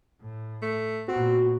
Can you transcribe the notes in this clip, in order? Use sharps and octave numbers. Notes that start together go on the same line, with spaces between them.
A2
A3
A#2 B3 C4 F#4